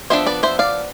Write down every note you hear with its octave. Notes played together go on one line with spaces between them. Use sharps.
F3 B3 D4 C5 E5
B4 D5
C5 E5
D5 F5